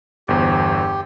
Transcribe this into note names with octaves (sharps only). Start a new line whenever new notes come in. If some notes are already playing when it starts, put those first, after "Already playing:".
G1 E2 G4 C5